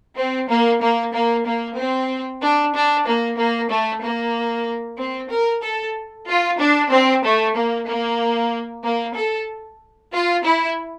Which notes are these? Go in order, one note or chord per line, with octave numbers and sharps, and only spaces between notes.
C4
A#3
A#3
A#3
A#3
C4
D4
D4
A#3
A#3
A3
A#3
C4
A#4
A4
F4
D4
C4
A3
A#3
A#3
A#3
A4
F4
E4